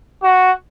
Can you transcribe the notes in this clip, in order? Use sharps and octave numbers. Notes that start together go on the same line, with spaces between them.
F#4